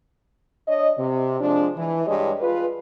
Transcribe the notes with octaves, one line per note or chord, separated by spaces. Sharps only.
D4 C#5 D#5
C3
F3 G#3 D4
E3
G2 G#3 G4 C#5 D#5
F4 G#4 B4